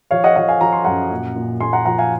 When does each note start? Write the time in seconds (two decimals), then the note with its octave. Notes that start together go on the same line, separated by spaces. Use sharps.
0.11 F3 C#5 F5
0.24 D#5 F#5
0.36 F3 D#5 F#5
0.48 F5 G#5
0.61 F3 A#5
0.73 C6
0.84 F#2 F#5 A#5
1.11 A#2
1.36 A#2
1.60 A#2 G#5 C6
1.73 F#5 A#5
1.85 F3 F#5 A#5
1.98 F5 G#5